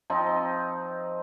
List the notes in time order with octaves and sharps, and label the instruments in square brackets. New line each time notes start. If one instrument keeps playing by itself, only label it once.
[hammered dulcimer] F3 C4 D#4 D#5